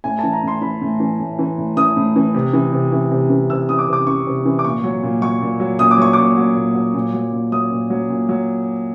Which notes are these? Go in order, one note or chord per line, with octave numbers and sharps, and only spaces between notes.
A2 G#5
E3 A5
A#5
A2 C6
E3 B5
A2
E3
A2
E3
A2
E3 D#6
A2
E3
C3
E3
C3
E3
C3
E3
C3 E6
E3 D#6
D6
C3
D6
E3 C#6
C3
E3
D6
A#2 C#6
F#3
A#2
F#3 C#6
A#2
F#3
A#2 D#6
D6
F#3 C#6
A#2 D6
F#3
A#2
F#3
A#2
F#3
A#2
F#3 D#6
A#2
F#3
A#2
F#3